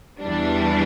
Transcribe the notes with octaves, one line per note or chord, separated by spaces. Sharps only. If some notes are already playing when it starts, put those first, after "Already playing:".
E2 E3 G3 D4